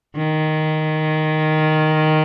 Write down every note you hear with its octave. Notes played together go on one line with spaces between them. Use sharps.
D#3